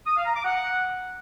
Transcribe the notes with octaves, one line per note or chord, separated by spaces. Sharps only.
D#6
F5
A#5
D6
F#5